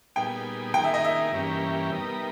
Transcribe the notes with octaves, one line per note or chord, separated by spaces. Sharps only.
A#2 G3 B3 D#4 G#4 G5
D#3 A#3 D#4 G#4 G5
E5
D#5
E5
G2 E3 A#3 C#4 G4
G3 B3 D#4 A#4